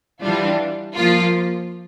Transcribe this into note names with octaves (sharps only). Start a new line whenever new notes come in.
E3 G3 D4 F4
F3 A#3 F4